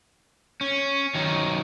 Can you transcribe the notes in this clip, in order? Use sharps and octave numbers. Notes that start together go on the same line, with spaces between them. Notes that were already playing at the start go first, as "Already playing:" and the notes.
C#4
D#3 F#3